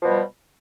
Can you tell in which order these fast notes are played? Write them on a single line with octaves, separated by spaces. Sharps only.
F3 B2 G3